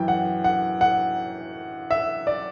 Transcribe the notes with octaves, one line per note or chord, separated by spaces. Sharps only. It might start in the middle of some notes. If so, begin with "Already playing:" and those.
Already playing: F#2 E3 G5
F#5
F#5
F#5
E5
D5